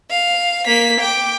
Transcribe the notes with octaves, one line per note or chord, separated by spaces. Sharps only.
F5
A#3 B6
G5 D6